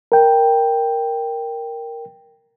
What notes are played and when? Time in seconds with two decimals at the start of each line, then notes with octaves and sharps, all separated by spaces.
0.12 A#4 G5